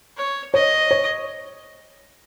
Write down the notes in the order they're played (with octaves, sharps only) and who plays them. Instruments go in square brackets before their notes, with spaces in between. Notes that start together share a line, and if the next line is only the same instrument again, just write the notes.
[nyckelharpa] C#5
[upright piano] C#5 [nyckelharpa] D#5
[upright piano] C#5